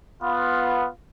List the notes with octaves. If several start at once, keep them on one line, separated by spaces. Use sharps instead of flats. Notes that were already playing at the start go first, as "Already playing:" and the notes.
B3 F4